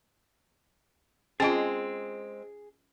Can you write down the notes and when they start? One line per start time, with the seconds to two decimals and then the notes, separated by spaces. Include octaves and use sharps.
1.40 G#3 C4 C#4 F4 G#4 G#5